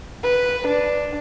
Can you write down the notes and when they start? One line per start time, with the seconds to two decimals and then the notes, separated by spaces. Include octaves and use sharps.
0.23 B4
0.68 D4